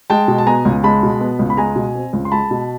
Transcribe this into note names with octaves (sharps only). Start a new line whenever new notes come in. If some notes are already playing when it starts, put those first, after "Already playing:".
G#3 G5 A5
B2
A5
B3 G#5 A#5
C#2
G#3 A5 B5
B2
B3
C#2
B5
G#3 G#5 A#5
B2
C4
C#2
C6
G#3 A5 B5
B2